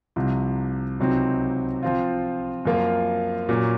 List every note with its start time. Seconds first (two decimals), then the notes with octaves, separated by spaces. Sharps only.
0.16 C2 C3 F3
1.00 C#2 C3 F#3 C4 D#4
1.83 F3 C4 F4
2.65 F#2 F3 A#3 F4
3.49 A#2 F#3 C#4